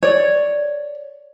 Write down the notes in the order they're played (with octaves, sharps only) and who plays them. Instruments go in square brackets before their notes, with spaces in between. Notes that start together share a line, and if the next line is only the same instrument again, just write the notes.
[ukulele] C#5 D5